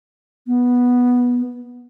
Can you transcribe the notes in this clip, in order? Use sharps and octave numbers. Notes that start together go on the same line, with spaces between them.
B3